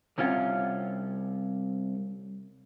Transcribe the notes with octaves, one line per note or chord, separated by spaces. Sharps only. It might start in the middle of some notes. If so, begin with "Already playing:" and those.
C2 C3 C#4 F4 C#5 F#5